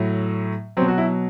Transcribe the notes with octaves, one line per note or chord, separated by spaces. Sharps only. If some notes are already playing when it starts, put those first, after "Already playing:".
Already playing: A2 F#3
B2 F#3 C4
F#4
E4